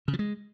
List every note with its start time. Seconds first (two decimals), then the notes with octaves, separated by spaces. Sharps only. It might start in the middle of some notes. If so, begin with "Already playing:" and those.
0.08 C#3
0.13 F3
0.19 G#3